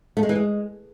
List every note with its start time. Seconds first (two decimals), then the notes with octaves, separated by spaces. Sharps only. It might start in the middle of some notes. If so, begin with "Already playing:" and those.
0.17 A3
0.23 G#3
0.29 E3
0.35 G#3